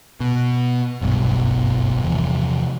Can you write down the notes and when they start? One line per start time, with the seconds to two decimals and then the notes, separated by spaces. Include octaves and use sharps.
0.20 B2
1.01 F#1 B1 G2 B2
2.03 E2 C3 E3 F3